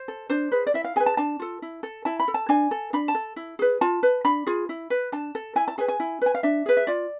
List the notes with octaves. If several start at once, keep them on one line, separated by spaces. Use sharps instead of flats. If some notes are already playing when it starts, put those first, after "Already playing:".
Already playing: C5
A4
D4 C5
G#4 B4
D5
E4 E5
F5
G#4 B4 G#5
A5
D4 A5
F4 A4
E4
A4
E4 A5
B5
A4
A5
D4 G#5
A4
D4 B5
A5
A4
E4
G#4 B4
F4 A5
B4
D4 B5
F4 G#4
E4
B4
D4 A5
A4
E4 G#5
A5
G#4 B4 G#5
G#5
E4
B4 G#5
F5
D4 E5
G#4 B4
E5
F4 D5